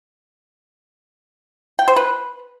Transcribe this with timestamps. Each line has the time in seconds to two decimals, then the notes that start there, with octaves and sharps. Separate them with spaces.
1.79 G5
1.88 C5
1.96 B4